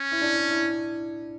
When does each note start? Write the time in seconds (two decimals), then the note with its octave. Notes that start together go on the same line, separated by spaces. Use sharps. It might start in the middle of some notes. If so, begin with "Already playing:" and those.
Already playing: C#4
0.12 E4
0.22 D4
0.51 E4